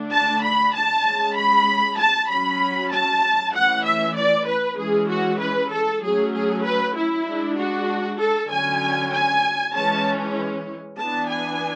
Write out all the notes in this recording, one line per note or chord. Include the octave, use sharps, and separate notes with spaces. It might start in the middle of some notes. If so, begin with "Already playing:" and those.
Already playing: D3 A3 D4
A5
B5
A5
G#3 C#4
B5
A5
F#3 C#4 B5
A5
E3 A3 C#4 F#5
E5
D5
B4
E3 G#3 C#4 G#4
F#4
B4
A4
F#3 A3 C#4 G#4
G#4
B4
E4
G#3 D4
F#4
A4
D3 F#3 C#4 G#5
G#5
E3 G#3 C#4 A5
E3 B3 D4 A5
G#5